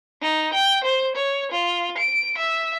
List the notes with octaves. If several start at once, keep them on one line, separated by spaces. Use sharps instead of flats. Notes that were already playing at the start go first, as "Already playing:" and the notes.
D#4
G5
C5
C#5
F4
D7
E5